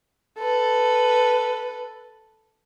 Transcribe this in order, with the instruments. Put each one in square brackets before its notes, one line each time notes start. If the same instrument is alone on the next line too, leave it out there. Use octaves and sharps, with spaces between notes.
[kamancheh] A4 B4